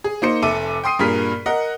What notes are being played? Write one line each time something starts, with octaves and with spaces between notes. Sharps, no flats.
G#4
A#3 D#4 C5 C#7
F1 A4 E5 D6 D#7
G5 C6 D#6 C7 D#7
G2 A#2 G#4 A#4 F6 B6
A#4 D#5 F#5